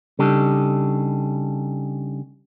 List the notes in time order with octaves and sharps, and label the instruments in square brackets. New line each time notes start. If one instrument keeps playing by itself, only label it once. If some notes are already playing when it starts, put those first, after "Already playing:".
[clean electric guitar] C#3 G3 D4 D#4 G4 A4